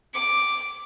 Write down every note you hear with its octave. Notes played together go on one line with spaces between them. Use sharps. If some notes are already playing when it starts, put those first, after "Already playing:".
D6